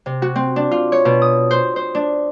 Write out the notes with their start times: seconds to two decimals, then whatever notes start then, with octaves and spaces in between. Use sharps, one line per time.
0.06 C3
0.22 F#4
0.36 C4
0.56 D4
0.71 F4
0.92 C#5
1.05 B2
1.22 D#6
1.51 C5
1.76 C5
1.95 D4